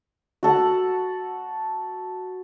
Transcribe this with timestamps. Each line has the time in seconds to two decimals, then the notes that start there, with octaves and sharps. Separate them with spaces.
0.43 F#4 A4 F#5